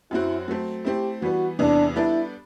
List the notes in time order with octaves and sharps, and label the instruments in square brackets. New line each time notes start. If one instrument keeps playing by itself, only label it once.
[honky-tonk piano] F#2 F#3 C4 F#4 [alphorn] E4
[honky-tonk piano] F#3 A3 C4
[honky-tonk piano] A3 C4 E4 [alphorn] G4
[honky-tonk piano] E3 G3 B3 [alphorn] F#4
[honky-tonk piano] E2 C3 E3 B3 [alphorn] D4
[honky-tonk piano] G3 B3 D4 A4 D5 [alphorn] E4